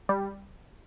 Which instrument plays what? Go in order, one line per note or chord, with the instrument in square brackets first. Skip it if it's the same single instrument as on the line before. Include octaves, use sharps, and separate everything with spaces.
[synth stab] G3